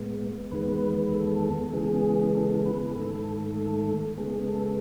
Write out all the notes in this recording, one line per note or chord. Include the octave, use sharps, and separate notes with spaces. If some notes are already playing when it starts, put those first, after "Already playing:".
Already playing: A2 G#3 B3
E2 D#3 G#3 B3 B4
A4
A4
C#3 E3 G#3 B3 G#4
A4
B4
G#4
G#2 D#3 A3 A4
A4
C#3 G#3 B3 G#4
A4